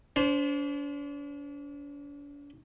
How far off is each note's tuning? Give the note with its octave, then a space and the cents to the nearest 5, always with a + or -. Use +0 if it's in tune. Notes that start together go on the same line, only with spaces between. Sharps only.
D4 -40 C5 -5